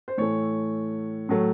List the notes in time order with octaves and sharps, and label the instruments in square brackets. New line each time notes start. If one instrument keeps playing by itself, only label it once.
[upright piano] C5
A2 E3 A3 C#5
A2 F#3 A3